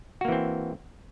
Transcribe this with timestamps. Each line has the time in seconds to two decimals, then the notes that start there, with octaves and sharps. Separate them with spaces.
0.21 F#4
0.25 A#3
0.28 E3
0.32 C4